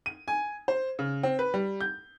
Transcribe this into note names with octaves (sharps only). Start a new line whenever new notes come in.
D#7
G#5
C5
C#3
C4
B4
G3
G6